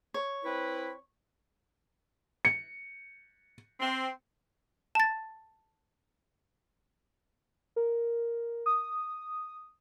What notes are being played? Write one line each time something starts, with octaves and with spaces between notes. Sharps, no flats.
C#5
C4 E4 B4
C#7
C4
A5 A6
A#4
D#6